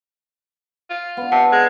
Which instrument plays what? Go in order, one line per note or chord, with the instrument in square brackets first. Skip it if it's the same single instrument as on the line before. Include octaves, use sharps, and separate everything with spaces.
[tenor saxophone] F4
[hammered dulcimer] B3 D4
[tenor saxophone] C3 [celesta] F#5 A5
[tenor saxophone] G#3